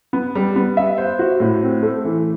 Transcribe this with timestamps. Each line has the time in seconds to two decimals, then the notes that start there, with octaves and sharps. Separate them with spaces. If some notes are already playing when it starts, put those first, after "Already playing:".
0.13 B3
0.35 G3
0.56 B3
0.77 E5
0.98 C5
1.19 F#4
1.40 A2
1.62 C4
1.82 A3
2.05 E3